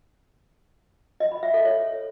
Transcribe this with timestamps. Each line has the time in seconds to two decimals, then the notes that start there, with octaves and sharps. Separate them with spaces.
1.20 D#5
1.32 B5
1.43 E5
1.54 A4
1.65 C#5